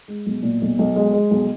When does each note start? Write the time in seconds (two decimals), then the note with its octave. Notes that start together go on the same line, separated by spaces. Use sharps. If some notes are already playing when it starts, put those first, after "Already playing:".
0.08 G#3
0.26 B1
0.43 A#2
0.62 B1
0.79 B1
0.96 G#3
1.13 G#3
1.31 B1